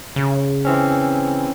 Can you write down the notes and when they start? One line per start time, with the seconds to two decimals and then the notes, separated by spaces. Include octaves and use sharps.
0.16 C#3
0.65 E3 C4 C#4